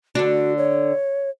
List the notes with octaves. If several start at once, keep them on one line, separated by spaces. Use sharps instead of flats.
D3 D4 F#4
C#5